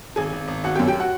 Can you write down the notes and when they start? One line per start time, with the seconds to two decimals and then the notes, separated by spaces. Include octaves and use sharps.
0.16 G#1 G#4 G#5
0.32 G#1
0.48 G#1
0.64 G#1 F#4 F#5
0.75 G4 G5
0.79 F#2
0.87 G4 G5
1.00 F#4 F#5